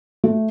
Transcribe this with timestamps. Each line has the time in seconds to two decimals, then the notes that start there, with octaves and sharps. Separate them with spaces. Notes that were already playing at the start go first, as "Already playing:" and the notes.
0.24 A3